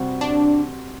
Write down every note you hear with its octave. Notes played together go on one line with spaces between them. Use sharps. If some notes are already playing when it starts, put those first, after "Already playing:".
Already playing: C3 G3 C4 F#4
D4